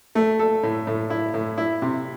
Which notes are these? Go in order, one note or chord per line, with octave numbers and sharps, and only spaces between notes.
A3
A4
A2
A2
E4
A2
E4
C3